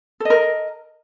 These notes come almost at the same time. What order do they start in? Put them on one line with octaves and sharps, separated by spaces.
A4 D#5 A#4